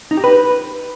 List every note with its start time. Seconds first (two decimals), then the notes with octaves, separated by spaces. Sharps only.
0.11 D#4
0.17 G4
0.24 B4